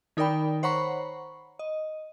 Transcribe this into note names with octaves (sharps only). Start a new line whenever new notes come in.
D#3 D#4 A#4 D5 G5 B5
C5 C#5 F#5 A#5 B5 C#6
D#5